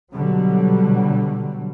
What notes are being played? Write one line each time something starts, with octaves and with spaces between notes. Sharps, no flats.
B2 D3 F#3 G3